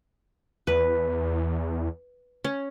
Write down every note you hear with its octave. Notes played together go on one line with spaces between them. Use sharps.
E2 B4
C#4